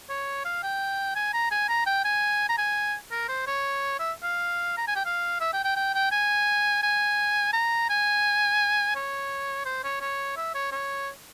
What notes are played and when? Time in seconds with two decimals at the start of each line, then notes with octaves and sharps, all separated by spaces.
0.10 C#5
0.45 F5
0.64 G5
1.16 G#5
1.34 A#5
1.51 G#5
1.69 A#5
1.86 G5
2.05 G#5
2.49 A#5
2.58 G#5
3.11 A#4
3.29 C5
3.47 C#5
4.00 E5
4.23 F5
4.78 A#5
4.88 G#5
4.96 G5
5.06 F5
5.41 E5
5.53 G5
5.65 G5
5.76 G5
5.95 G5
6.12 G#5
6.83 G#5
7.53 A#5
7.90 G#5
8.96 C#5
9.66 C5
9.84 C#5
10.01 C#5
10.37 E5
10.55 C#5
10.72 C#5